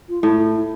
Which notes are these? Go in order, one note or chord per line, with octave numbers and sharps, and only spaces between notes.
F4
A2 E4